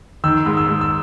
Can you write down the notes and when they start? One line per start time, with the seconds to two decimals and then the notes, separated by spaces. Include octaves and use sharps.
0.24 D#3 E6
0.46 G#2
0.57 E6
0.69 G#2
0.81 E6